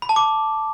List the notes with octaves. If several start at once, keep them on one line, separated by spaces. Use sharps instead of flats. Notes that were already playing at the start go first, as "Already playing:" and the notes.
B5
A5
D6